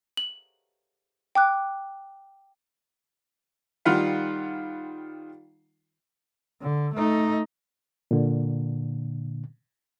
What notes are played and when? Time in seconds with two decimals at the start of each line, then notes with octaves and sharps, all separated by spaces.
0.17 F#7
1.35 G5 D6 F#6
3.85 D#3 G3 F4 F5 F#5 B5
6.62 D3
6.94 A3 D#4
8.11 A#2 D3